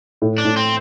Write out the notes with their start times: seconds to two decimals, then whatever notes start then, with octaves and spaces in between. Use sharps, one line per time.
0.22 A2
0.38 D4
0.45 A2
0.57 C4